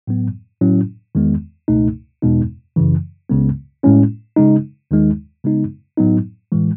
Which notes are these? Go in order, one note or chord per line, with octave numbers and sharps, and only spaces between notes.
A2 F#3 B3
A2 F#3 C#4 E4
E2 D#3 G#3 B3
C#2 B2 A3 D#4
E2 B2 G#3 B3 D#4
F#2 C#3 E3
C#2 C#3 G#3 B3
A2 G#3 C#4 E4
C#3 G#3 D#4
D#2 D#3 G#3 D#4
C#3 G#3 B3 D#4
A2 F#3 B3 D#4
A2 E3 G#3